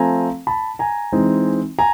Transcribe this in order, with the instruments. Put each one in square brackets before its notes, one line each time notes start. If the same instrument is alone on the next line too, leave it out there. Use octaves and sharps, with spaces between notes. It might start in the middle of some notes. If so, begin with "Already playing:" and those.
Already playing: [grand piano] F3 A3 C4 G#5 A#5
A5 B5
G#5 A#5
E3 G#3 C4 D#4
G#5 A#5